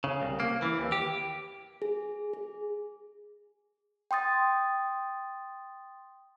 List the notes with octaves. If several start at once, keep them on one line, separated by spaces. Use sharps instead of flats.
C#3
C2
A#3
E3
D#2
G4
G#4
G#4
G5 C6 D#6 A6